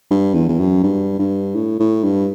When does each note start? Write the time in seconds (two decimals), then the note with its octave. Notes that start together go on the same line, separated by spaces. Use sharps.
0.11 G2
0.34 E2
0.49 E2
0.59 F#2
0.83 G2
1.19 G2
1.55 A2
1.80 A2
2.04 G2